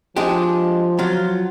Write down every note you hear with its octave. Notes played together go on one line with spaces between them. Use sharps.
F3 G#3 D4 G4
F#3 F4